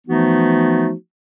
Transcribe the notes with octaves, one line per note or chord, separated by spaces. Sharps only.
E3 F3 A3 B3 D#4 F#4